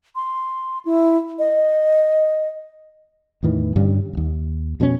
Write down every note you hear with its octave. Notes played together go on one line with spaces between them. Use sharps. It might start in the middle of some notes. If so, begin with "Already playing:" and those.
C6
E4
D#5
E2 A2 D#3 E3
G2 D3 G3 C#4
D1 D#2
F2 B2 B3 C#4